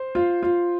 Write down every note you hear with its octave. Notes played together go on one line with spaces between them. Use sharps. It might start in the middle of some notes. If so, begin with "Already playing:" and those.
Already playing: C5
F4
F4